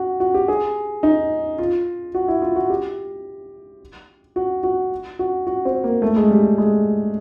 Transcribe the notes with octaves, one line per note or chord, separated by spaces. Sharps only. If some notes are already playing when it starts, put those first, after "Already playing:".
Already playing: F#4
F#4
G4
G#4
D#4
F4
F#4
E4
F4
F#4
G4
F#4
F#4
F#4
F#4
C4
A#3
A3
G#3
G3
G3
G#3